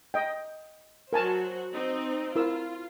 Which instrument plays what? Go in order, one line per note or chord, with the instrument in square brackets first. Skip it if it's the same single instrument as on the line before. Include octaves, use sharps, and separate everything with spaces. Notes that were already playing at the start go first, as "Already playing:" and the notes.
[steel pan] D#5 G5
[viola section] F#3 F#4 C5 [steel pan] A#4 G#5 A5
[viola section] C4 D#4
[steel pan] E4 A#4 E6 [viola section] F4